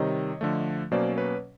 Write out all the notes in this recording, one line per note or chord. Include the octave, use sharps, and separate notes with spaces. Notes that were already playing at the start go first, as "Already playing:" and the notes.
Already playing: C3 D#3 G3 C#5 D#5
D3 F3 A3
B2 F#3 A#3 C#4 C5 D5
B4 C#5